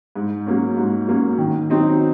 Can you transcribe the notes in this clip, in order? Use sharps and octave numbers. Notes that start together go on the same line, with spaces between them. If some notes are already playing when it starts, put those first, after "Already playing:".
G#2
F#3 A#3 C#4
G#2
F#3 A#3 C#4
D#3
F#3 C4 D#4